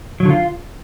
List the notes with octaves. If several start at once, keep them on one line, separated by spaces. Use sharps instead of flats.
F#3
D3
F4